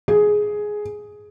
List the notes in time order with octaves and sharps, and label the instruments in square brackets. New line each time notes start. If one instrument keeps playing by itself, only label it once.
[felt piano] G#4